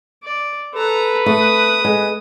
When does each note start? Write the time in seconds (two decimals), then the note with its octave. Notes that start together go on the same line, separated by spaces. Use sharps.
0.24 D5
0.75 A4 B4 A#5
1.26 A3 D#6
1.85 G#3